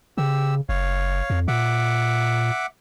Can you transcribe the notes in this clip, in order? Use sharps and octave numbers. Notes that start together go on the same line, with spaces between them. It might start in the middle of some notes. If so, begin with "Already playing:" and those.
C#3 G4 E6
F#1 C#5 F5
F2
A#2 E5 F#5 D6